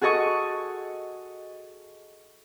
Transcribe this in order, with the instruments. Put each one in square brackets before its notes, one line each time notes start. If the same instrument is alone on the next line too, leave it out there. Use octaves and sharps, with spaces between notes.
[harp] F#4 G#4 A4 D#5 C#6